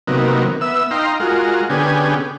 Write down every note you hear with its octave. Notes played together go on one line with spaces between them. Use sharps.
C3 D#3 F#3 A#3 B3
B3 E5 E6
D#4 F5 G5 A#5 C6
G#3 F4 F#4 A#4
D3 B3 C#4 G4 G#4